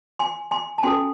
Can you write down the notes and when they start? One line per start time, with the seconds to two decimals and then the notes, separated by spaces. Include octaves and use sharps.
0.19 G#5 C6
0.51 G#5 C6
0.78 A5
0.83 C#4 F#4 A4 G#5 C6